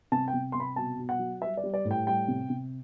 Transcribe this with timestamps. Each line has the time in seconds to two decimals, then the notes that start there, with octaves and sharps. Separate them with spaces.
0.12 C3 A5
0.28 G5
0.34 C3
0.52 C3 C6
0.60 B5
0.76 B2 A5
0.99 B2
1.09 F#5
1.19 F#3
1.42 G3 E5
1.57 D5
1.64 G3
1.74 D5
1.85 A2
1.91 G5
2.07 G3 G5
2.28 C3
2.50 C3